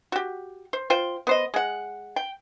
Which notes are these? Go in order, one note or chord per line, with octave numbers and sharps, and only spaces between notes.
F#4 G4
C5
F4 C5 G5
B3 C5 D#5
G#3 F#5
G5